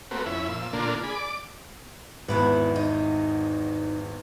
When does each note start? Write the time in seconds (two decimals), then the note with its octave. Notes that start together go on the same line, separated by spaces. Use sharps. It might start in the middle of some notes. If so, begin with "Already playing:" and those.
0.11 A3 A#3 C4 F#4 B4
0.26 F2 C#4 E4 E5 B5
0.48 A#2 F3 E6
0.73 A#2 D3 A#3 D4 F4
1.03 G#4 D5 B5
1.15 D5 D6
2.28 G#1 E2 B3 E4 B4
2.76 D#4